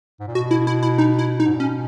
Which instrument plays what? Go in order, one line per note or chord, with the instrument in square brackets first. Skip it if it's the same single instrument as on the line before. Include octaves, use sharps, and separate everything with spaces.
[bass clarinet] G#2
A#2
[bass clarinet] B2 [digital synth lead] F#4
[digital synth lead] E4
E4
E4
D#4
E4
D#4
[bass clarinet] G#2
A#2
[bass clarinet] B2 [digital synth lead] C#4